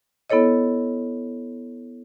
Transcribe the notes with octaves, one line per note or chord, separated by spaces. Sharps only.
B3 E4 A4 C#5 D#5